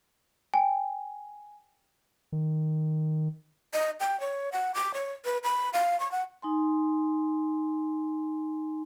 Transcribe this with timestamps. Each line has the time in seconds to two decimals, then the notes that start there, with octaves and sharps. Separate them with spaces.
0.54 G5 G#5
2.32 D#3
3.74 D#5
4.00 G5
4.20 C#5
4.52 F#5
4.74 D6
4.94 C#5
5.25 B4
5.44 B5
5.73 F5
6.00 C#6
6.12 F#5
6.42 D#4 G#5 C6